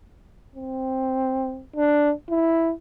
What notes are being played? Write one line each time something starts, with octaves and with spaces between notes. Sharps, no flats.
C4
D4
E4